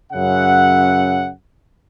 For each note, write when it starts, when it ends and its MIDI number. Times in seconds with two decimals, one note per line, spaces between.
0.13 1.30 42
0.13 1.30 49
0.13 1.30 76
0.13 1.30 78